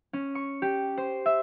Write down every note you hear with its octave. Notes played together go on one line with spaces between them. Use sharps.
C#4
C#6
G4
C5
E5